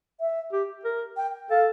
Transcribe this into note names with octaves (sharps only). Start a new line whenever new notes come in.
E5
G4
A#4
G5
A4 F5